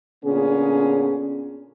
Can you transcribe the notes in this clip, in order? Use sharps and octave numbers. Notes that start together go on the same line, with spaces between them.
A#2 D3 B3 C#4 G#4